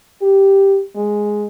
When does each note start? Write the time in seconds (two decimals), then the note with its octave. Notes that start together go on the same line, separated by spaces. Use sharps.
0.22 G4
0.96 G#3